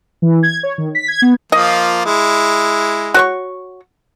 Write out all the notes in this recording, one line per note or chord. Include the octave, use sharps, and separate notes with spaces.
E3
G#6
C#5
D#3
B6
G#6
B3
F3 A#3 F4 D#5
G#3 E4
F#4 C#5 C#6